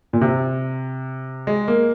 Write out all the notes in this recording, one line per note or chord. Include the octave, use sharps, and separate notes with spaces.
A#2
C3
G#3
A#3